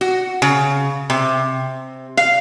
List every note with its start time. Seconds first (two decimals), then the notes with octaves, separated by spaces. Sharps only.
0.01 F#4
0.42 C#3
1.10 C3
2.17 F5